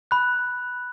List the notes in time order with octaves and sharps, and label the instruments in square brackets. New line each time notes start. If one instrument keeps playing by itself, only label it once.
[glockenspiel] B5 F#6